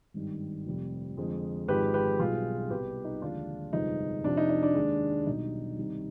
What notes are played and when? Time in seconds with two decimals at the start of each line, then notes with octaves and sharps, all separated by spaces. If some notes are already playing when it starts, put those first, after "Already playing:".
0.14 G#1 G2 D#3 G3
0.66 F1 F2 C3 G3
1.17 F2 D3 G#3
1.68 G#1 G#2 F3 G#3 G4 B4
1.94 G4 B4
2.19 B1 B2 G3 F4 G#4
2.70 C2 B2 G3 G4 B4
3.05 D#4
3.22 D#2 D3 F3 G#3 D4 F4
3.73 G1 F2 C3 F3 G#3 D#4
4.24 F2 C3 F3 D4
4.37 D#4
4.50 D#4
4.63 D4
4.75 D#2 D#3 G#3
5.26 B1 B2 G3 D#4
5.77 C2 C3 D#3 G3